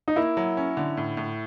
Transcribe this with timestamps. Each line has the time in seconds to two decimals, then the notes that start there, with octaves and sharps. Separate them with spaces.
0.08 D#4
0.16 A#3 E4
0.37 F#3
0.57 C#4
0.77 D3
0.97 A2
1.17 A2